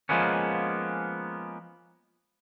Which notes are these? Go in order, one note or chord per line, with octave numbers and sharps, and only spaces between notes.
F3 G#3 A#3 B3 C#4